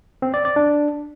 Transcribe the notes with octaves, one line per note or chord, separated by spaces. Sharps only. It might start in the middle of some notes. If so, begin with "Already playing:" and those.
C4
D5
D5
D4